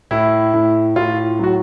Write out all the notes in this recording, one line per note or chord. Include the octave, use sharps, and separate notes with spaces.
A2 E4
A2
A2 F4
F#3 F#4